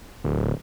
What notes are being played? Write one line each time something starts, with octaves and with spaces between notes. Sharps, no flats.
D1